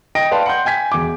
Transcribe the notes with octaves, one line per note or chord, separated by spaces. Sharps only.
D#5 G5 D#6 A#6 D7
B4 D5 F5 G5 A5 C6
F#5 C6 G6
G5 G#5 G#6 B6
E1 D6